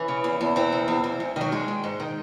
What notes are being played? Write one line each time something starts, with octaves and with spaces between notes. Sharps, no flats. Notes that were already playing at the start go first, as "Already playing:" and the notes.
Already playing: E3 C#4
C#3
E2
E2
E3 C4
C#3
E2
E2
G#2
D#3 F#3
G#2 G#3
D#3
G#2
D#3